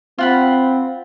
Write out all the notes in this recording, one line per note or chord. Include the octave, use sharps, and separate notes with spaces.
C4 F4 F#5 B5